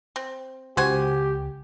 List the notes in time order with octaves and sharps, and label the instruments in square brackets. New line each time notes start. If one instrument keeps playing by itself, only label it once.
[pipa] C4
[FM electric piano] C#2 [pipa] F#4 C5 G#5 [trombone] G4